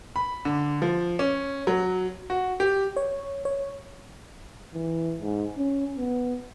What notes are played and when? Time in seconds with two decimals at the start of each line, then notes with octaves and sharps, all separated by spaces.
0.16 B5
0.45 D3
0.82 F3
1.19 C#4
1.67 F#3
2.30 F#4
2.60 G4
2.97 C#5
3.45 C#5
4.74 E3
5.20 G#2
5.58 C#4
5.97 B3